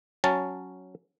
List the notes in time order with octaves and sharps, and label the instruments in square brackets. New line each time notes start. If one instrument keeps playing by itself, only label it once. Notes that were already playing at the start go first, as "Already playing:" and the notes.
[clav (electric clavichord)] F#3 C#4 A5